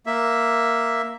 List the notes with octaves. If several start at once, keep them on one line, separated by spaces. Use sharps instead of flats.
A#3 E5